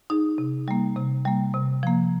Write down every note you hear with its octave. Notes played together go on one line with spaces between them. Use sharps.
D#4 G#4
C3
G3 A#3
C3
G3 A#3
C3
F3 A#3